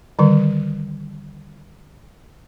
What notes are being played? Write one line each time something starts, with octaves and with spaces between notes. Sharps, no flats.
D3 D#3 G3